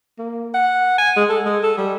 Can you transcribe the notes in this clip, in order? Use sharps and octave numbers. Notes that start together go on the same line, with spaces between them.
A#3
F#5
G#5
G#3
A4
G#3
A4
G3